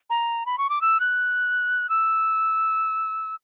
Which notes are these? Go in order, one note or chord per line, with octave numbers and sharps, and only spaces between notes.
A#5
B5
C#6
D6
E6
F#6
E6